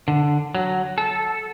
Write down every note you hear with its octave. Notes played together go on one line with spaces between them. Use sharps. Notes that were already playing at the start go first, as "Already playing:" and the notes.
D3
F#3
A4